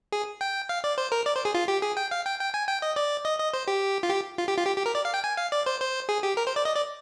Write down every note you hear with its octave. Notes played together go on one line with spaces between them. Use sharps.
G#4
G5
F5
D5
C5
A#4
D5
C5
G#4
F4
G4
G#4
G5
F5
G5
G5
G#5
G5
D#5
D5
D#5
D#5
C5
G4
F4
G4
F4
G4
F4
G4
G4
A#4
D5
F5
G5
G#5
F5
D5
C5
C5
G#4
G4
A#4
C5
D5
D#5
D5